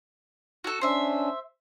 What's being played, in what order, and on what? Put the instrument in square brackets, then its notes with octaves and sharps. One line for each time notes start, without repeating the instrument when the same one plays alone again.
[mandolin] F#4 A4
[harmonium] C#4 D4 [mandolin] C5 E5